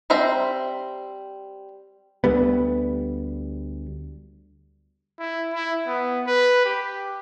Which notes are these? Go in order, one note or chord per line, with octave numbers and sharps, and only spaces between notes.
G3 C4 C5 E5 A#5
D2 G3 B3
E4
E4
B3
B4
G4